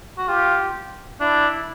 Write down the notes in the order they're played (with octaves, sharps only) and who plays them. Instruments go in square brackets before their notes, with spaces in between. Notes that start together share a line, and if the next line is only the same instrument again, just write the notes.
[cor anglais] F#4
[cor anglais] F4 [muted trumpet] G4
[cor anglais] D4 [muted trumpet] E4